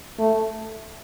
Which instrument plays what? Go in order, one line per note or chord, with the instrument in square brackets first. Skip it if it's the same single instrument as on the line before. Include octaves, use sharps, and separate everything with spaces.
[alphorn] A3